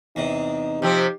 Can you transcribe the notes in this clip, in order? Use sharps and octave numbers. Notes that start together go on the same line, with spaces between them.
E2 C3 D#4
C3 F3 C4 G4